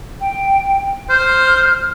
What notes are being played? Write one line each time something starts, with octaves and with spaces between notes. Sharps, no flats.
G5
C5 F6